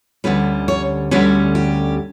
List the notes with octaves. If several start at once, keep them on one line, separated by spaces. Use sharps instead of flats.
D2 D3 G3 C#4 B4
C#5
D2 D3 G3 C#4 B4
G4